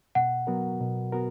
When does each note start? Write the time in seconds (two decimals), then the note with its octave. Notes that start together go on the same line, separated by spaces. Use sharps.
0.15 B2 F#5
0.47 F#3 B3 F#4 A#4
0.80 B2
1.12 B3 F#4 A#4